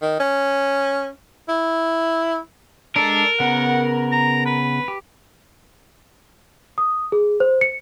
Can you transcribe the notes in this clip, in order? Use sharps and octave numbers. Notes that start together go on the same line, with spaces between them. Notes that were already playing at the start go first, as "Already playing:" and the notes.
D#3
C#4
E4
G#3 D4 A4 A#4
C#3 B3 F#5
A#5
B4
G4
D#6
G#4
C5
C#7